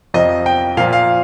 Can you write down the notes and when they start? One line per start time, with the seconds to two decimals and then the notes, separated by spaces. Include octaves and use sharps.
0.14 F2 C3 F3 D#5
0.46 G5
0.77 A#2 F3 F5
0.93 F5